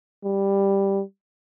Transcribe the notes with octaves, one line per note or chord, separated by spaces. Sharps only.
G3